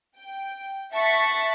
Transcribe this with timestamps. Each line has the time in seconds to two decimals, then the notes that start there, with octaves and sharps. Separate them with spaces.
0.17 G5
0.93 E5 F#5 A5 C#6 A6 B6